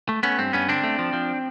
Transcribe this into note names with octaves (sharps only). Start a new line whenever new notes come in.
A3
A3 B3 C#4
G2 C4
G2 B3 C#4
D3 C4 D4
A3
F3
F3